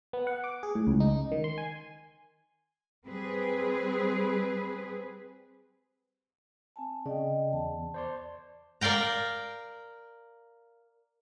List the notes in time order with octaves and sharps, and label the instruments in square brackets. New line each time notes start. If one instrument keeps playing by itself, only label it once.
[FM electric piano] B3
F#5
D6
G#4
A2
C#2
D#4
D#3
C6
G#5
[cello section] G3 C4 G#4 B4
[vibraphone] C4 G#5 A5
[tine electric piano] C#3 [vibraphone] D5 D#5 G5
[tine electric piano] E2 [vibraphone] A5
[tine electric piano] C5 D5 C6
[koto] A#4 D5 F5 G5 A#5